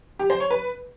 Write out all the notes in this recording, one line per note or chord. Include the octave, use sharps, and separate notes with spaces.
G4
C5
C#5
B4